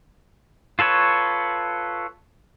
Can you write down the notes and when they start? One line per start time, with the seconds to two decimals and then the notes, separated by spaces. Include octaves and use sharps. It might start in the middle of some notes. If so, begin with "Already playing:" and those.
0.79 F4 A4 B4 C#5